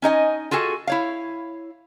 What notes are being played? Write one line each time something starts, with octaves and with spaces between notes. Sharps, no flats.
C#4 D#4 D#5 G#5
F4 F#4 G#4 A4 G#5
E4 C#5 F5